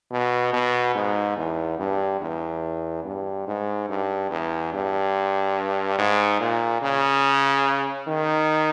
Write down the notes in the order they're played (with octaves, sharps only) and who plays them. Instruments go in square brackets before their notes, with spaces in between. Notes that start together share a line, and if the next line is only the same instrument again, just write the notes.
[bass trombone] B2
B2
G#2
E2
G2
E2
G2
G#2
G2
E2
G2
G#2
A#2
C#3
D#3